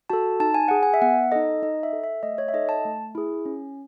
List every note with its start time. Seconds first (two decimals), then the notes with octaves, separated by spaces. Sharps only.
0.10 F#4 A4 A5
0.40 D#4 A5
0.54 G#5
0.68 G#4 F#5
0.83 G#5
0.94 E5
1.02 B3 F#5
1.32 D#4 A4 D#5
1.62 D#4 D#5
1.83 E5
1.93 A4
2.03 E5
2.23 A3 D#5
2.38 C#5
2.48 E5
2.54 D#4 A4 D#5
2.69 A5
2.85 A3
3.15 E4 G#4
3.45 C#4